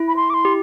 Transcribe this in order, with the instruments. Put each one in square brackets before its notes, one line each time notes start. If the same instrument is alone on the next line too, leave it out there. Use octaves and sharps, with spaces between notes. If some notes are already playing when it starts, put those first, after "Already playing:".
Already playing: [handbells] E4
[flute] B5
C6
D6
C6
[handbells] G4